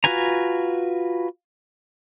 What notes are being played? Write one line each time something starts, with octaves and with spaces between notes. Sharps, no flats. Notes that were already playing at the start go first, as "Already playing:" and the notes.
F4 F#4 B4 G#5 A#5